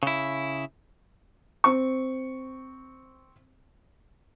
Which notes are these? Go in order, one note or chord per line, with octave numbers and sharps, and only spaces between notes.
C#3 E4
C4 C#6